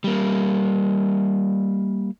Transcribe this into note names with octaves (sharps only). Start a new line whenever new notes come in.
G3 A#3